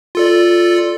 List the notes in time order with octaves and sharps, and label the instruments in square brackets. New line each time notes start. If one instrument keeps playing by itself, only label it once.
[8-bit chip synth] F4 A4 D5